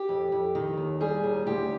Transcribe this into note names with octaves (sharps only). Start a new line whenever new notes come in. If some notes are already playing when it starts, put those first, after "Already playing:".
Already playing: G4
F2
F2
D#3
D#2
G3 G#4
D#2
D2 G4